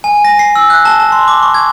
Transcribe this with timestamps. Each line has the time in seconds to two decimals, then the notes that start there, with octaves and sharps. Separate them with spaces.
0.04 G#5
0.25 A#6
0.39 C7
0.55 E6
0.70 F#6
0.85 A5
1.00 A5
1.12 C6
1.28 D6
1.43 C#6
1.54 G#6